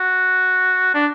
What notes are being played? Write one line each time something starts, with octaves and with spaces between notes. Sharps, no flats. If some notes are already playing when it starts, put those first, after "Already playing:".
Already playing: F#4
D4